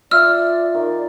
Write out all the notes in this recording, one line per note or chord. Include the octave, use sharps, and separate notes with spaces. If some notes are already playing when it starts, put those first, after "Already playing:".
F4 D5 E5 E6 F6
D#3 D5